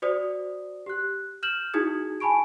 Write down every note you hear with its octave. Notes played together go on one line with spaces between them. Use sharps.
F#4 C5 D5 D#6
G4 F#6
F6 G6 E7 F#7
D#4 E4 F#4 G#4 D#6 G#6
G#5 A5 B5 C#6 D7